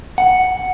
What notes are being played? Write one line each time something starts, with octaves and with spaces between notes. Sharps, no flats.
F#5